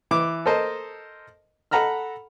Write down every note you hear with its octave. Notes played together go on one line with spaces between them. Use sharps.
E3 D6
A4 A#4 C5 D#5 A5
A4 F#5 A#5 B5 F6